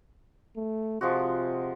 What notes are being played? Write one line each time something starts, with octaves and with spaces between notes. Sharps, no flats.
A3
C3 F3 G#3 F#4